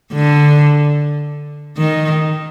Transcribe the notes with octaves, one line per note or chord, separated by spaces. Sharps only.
D3
D#3